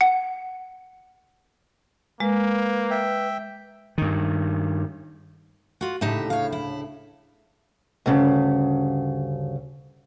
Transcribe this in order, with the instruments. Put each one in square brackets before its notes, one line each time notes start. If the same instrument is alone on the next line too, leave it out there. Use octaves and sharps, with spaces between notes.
[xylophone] F#5
[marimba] G#3 [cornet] A#3 [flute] B4
[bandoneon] E5 G5
[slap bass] G2 D#3
[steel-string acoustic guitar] F4 F#4
[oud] D2 A2 C#3 [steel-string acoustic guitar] D#4 G4 E5
[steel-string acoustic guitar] C#5 F5
E4
D2 G2 C#3